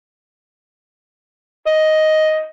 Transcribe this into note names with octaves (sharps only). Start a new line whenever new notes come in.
D#5